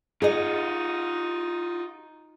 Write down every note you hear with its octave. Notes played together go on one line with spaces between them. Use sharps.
D#4 F4 F#4 G#4 D#5